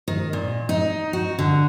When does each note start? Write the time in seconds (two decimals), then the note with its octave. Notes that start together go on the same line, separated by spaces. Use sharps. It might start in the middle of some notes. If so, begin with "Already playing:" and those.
0.08 D#3
0.33 A#2
0.69 D#4
1.13 F#4
1.39 D3